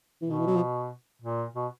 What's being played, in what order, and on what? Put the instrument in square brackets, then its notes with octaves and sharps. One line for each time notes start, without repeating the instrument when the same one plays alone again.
[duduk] B2 [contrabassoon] E3
[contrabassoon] D#3
E3
F#3
F3
[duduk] A#2
B2